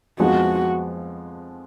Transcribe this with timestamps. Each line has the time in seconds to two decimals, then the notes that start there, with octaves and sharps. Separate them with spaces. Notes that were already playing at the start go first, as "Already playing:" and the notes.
0.20 F2 F3 G#3 B3 F#4